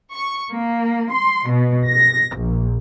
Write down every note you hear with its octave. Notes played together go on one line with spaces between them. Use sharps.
C#6
A#3
C6
B2
A#6
A#1